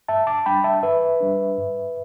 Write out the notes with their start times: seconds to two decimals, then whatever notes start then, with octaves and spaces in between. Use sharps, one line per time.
0.08 G2 E5 A5
0.27 A5 D6
0.46 G3 D4 G5 B5
0.64 E5 A5
0.83 G2 B4 E5
1.20 G3 D4
1.58 G2